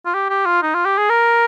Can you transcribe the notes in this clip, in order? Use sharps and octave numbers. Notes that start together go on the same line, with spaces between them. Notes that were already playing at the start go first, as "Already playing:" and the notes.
F4
G4
G4
F4
D#4
F4
G4
G#4
A#4